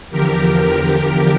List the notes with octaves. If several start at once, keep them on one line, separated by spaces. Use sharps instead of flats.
E2 D3 F3 G4 A#4